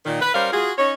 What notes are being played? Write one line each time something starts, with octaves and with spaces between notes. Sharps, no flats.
A#2 D#3
B4
G3 C#4 A#4 C5 F5
F4 F#4 G#4
C#4 D#4 C#5